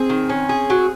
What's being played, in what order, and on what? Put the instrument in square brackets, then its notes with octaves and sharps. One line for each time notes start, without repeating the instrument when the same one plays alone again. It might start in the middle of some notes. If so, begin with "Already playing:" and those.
Already playing: [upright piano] C4 [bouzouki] G#4
[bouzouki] D#3
C#4
G#4
F#3